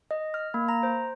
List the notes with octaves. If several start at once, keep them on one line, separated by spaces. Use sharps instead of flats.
D#5
F6
A#3
A#5
C5